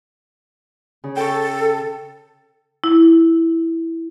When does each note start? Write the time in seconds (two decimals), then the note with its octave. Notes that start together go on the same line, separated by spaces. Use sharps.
1.04 C#3
1.16 A4 G5 C#6
2.84 E4